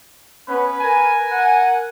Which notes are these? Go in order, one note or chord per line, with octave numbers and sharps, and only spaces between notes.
B3 C#4 B4
A#4 G#5
F#5